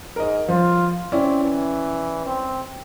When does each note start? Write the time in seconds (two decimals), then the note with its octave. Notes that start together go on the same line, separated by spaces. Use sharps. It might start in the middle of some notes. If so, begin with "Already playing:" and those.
0.16 G#2 A#4 D#5
0.48 F3 F4
1.12 C4 C#4 E4 D5
1.43 E3
2.26 C4